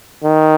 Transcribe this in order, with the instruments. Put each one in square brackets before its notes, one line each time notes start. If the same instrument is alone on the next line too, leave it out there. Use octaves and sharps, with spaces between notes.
[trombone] D#3